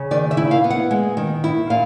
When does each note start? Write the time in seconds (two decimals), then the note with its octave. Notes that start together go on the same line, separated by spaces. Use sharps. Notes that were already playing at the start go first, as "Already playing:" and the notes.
Already playing: C#3
0.11 D#3 D5
0.31 E5
0.37 E4
0.51 F5
0.64 B3
0.70 F#5
0.91 G#3
1.17 D#3
1.44 E4
1.70 A#2 F5